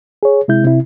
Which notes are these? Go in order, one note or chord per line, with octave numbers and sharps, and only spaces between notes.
G#4 C#5
C3 G#3 E4 G6
C3 E4